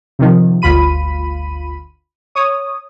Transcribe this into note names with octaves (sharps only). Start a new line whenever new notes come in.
C3 D#3 F3
G1 D2 F4 B5 D#7
C#5 D#6